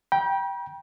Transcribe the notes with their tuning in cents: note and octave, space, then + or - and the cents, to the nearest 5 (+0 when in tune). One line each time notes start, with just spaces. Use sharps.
G5 +0 B5 -45